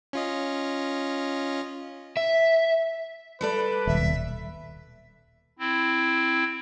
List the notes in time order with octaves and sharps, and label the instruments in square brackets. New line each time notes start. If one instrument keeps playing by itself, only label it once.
[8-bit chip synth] C#4 F4 D#5
[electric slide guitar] E5
[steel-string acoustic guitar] G3 A4 D5 [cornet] B4
[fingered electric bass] D#1 B1 [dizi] E5
[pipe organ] C4 E4